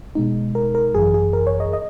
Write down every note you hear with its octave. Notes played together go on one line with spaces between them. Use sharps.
B2 G#3 D#4
A#4
A#4
G#1 F#2 E3 G#4
G#4
A#4
C#5
D#5
D#5